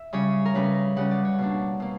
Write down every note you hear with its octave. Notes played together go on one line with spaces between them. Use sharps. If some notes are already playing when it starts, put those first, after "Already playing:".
Already playing: E5
C#3 G3 C#4 C#5
A#4
C#3 G3 C#4 B4
C#3 G3 C#4 F#5
D5
C#5
B2 A#3 D4
B2 A#3